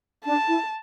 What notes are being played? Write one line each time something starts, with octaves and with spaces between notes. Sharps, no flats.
D4 A5
E4